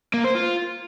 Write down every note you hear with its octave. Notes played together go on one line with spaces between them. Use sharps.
A#3
C5
F4